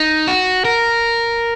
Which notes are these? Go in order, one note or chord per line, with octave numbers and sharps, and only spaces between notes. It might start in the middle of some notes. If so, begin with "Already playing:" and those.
Already playing: D#4
F#4
A#4